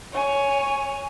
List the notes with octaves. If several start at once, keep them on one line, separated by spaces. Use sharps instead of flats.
C#5 G#5